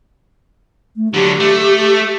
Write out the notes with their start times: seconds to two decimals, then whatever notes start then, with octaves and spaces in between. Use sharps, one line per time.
0.96 A3
1.14 D3 F#3 G4
1.40 A3